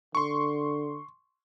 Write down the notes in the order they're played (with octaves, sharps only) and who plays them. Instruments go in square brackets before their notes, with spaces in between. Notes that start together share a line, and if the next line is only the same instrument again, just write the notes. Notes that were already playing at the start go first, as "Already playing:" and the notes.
[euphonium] D3 [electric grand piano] C6 C#6